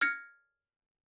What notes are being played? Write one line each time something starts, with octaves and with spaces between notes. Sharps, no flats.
F6 G#6 A#6 C#7